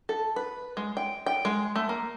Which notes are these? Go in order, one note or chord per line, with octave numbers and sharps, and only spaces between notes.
A4
B4
G#3
G5
G5
G#3
A3
A#3